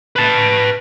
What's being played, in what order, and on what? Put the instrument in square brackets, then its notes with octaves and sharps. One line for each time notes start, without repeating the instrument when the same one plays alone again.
[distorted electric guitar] B4 A5